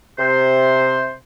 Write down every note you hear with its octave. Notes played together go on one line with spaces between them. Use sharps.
C3 C5